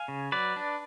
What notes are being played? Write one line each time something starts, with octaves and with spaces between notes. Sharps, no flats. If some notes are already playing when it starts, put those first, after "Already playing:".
Already playing: F5 G#5
C#3
F#3 B4 D5
D4